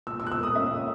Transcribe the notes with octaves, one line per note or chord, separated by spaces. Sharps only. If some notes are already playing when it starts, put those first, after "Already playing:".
A#2 E6
E6
A#2 F#6
E6
A#3 D#6
C#4 E5
A#2